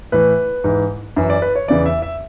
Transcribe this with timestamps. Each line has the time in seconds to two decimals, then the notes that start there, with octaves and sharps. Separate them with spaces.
0.12 A2 E3 B4
0.64 G#2 E3
1.16 F#2 E3
1.30 D5
1.42 B4
1.55 C#5
1.68 E2 C#3 E3 D5
1.86 E5
2.02 E5